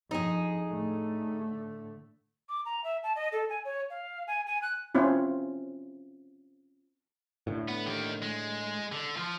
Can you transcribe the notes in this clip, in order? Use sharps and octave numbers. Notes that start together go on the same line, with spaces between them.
F2 D#4 G#4
A2 D3 A3
D6
A#5
E5
A5
D#5
A4
G#5
C#5
F5
G#5
G#5
F#6
C4 C#4 E4 F4
A2 D3
B3
D#3 G4
G#3
D3
F3 F4